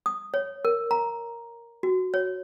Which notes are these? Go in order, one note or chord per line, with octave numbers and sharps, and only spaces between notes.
D#6
C#5
A#4
A#5
F#4
C#5